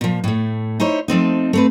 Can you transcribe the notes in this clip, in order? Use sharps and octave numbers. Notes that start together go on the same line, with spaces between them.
A#2 F3
A2 A3
D#4 E4 C5 C#5
F3 A3 C4 D#4
A3 C4 B4